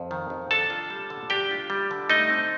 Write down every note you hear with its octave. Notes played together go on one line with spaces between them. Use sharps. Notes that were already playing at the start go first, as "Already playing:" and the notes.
Already playing: F2
D#3
F2
D4 A4 A5
F4
G3
D3
D4 G4 G5
F4
G3
D3
A3 D#4 D#5
C4